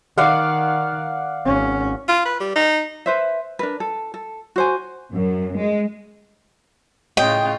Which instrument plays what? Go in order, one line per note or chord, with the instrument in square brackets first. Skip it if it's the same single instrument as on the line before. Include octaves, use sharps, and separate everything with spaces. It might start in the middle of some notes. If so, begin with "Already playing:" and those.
[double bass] D#3 [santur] D5 F5 F#5
[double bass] G#1 C#4
[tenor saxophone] F4
B4
G3
D#4
[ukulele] B4 C5 E5
D4 A#4 B4
A4
A4
F#4 C5 G#5
[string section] F#2
G#3
[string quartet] A2 C#3 F4 [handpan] C#5 D#5 [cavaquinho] G5